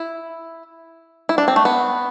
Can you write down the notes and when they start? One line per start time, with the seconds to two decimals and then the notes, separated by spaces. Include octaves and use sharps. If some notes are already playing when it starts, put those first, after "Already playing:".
Already playing: E4
1.29 E4
1.38 D4
1.48 C4
1.56 A3
1.65 B3